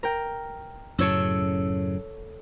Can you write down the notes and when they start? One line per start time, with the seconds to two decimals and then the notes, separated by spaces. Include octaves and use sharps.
0.03 A#4 G5
0.98 F#2 A2 C#3 A4 C#5 E6